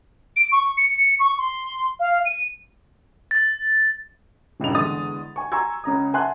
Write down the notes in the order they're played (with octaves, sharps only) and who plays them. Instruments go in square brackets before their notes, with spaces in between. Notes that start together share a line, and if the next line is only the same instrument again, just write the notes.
[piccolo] D7
C#6
C#7
C#6
C6
F5
D#7
[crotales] A6
[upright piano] D#1 C#2 G2 D#4 F7
E2 D3 G#3 D#6 A6
G#5 C#6
G#5 A#5 C6 C#6 E6 G#6
C#2 C#3 A#5 D#6
E5 F#5 G#5 A5 C6 F#6